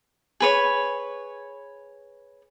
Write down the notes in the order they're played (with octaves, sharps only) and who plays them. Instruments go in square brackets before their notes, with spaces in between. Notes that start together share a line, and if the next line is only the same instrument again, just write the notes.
[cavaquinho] G#4 B4 C#5